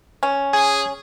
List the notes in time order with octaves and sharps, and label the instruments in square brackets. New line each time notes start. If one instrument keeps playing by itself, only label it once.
[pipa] C#4
[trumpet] G#4 [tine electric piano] G#5